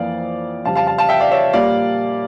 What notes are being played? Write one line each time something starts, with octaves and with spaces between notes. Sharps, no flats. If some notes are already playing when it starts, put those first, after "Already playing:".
Already playing: F2 E3 A#3 D5 F5
F2 C#3 G3 F5 A5
F5 A5
F5 A5
F5 A5
E5 G5
D5 F5
C#5 E5
A#2 G3 A#3 D5 F5